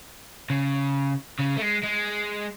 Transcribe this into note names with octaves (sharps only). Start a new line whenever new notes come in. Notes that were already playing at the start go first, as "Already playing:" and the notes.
C#3
C#3
A3
G#3
G#3